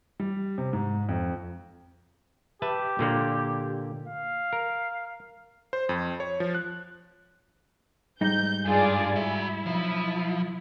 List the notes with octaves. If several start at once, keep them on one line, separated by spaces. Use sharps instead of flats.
G3
C3
G#2
F2
G4 B4 E5 A5
A#2 D3 A#3
F5
A#4
C5
F2
C#5
F3
F#6
G#2 G3 D#4 G6
G2 F4 G#4 D5
E4 F#4 E5
B1 F3